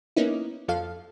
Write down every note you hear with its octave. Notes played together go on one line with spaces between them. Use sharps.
A#3 B3 C#4 D#4 E4
F2 F3 A4 F5